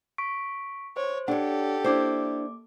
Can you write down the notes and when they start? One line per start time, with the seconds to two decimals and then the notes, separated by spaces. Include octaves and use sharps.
0.18 C#6 B6 D7
0.97 C5 C#5
1.28 D4 G4 A4 C#5 F#5
1.84 A#3 D4 E4 C5 D6